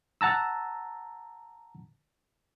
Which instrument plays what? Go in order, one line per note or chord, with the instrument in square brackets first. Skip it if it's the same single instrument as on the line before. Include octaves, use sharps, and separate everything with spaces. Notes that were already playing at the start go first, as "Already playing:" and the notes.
[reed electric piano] F#5 A5 A#5 E6